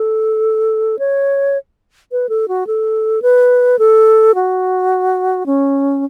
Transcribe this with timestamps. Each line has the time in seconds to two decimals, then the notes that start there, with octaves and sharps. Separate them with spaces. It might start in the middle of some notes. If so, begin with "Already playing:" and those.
Already playing: A4
0.99 C#5
2.12 B4
2.29 A4
2.48 F#4
2.67 A4
3.22 B4
3.79 A4
4.35 F#4
5.46 C#4